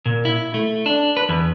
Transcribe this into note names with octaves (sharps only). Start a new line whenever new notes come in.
A#2
E4
A3
D4
B4
E2